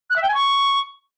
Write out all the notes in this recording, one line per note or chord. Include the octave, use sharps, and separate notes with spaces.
F#6
E5
G5
G#5
C#6